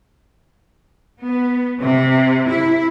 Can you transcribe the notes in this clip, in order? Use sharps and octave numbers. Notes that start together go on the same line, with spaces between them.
B3
C3
E4